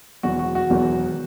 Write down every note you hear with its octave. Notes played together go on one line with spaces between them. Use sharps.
E1 E2 D#3 F#3 F#4
F#4
F#4
E1 E2 D#3 F#3